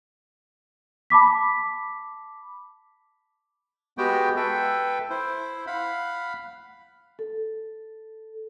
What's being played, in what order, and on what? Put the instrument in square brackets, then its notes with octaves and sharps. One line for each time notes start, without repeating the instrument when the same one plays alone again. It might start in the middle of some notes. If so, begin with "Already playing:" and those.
[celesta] A5 B5 D6 B6
[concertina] G#3 B3 F#4 G4 G5
A4 B4 E5 G5
E4 C5
F5 F#5 B5
[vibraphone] A4